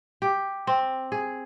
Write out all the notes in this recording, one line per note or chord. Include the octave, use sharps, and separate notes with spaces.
G4
C4
G#4